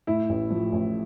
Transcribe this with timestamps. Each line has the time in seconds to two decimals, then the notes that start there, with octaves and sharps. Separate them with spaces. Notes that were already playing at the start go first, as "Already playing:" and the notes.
0.07 A2 E4
0.29 A1
0.51 F3
0.72 A1